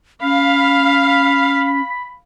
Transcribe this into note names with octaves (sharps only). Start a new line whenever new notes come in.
C#4 F5 B5